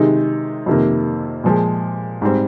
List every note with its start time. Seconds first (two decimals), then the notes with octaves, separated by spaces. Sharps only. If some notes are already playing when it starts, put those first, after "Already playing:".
Already playing: C3 D#3 G#3 D#4
0.66 F2 C3 D#3 A#3
1.44 A#2 F3 G#3
2.22 G#2 G3 C4